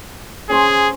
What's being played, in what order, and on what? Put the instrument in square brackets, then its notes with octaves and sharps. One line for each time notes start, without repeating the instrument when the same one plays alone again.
[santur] C#4 C5 C6 [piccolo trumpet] G#4